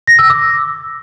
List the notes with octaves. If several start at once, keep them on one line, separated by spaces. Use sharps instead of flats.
A#6
E6
D6